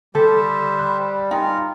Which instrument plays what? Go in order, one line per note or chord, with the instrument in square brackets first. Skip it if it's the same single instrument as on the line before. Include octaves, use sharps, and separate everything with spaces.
[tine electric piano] D3 [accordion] G3 [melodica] G4 C5 E5 [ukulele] A4
[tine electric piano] B5 F#6
[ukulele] D#4 [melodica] F4 A#4 [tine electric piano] G5 G#5